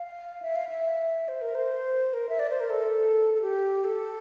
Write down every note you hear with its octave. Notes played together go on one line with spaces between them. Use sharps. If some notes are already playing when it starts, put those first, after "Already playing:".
Already playing: F5
E5
F5
E5
C5
A#4
C5
A#4
E5
D5
C5
A#4
A4
A4
G4
A4